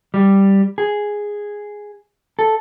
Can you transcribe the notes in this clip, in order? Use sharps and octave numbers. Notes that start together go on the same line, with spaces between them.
G3
G#4
A4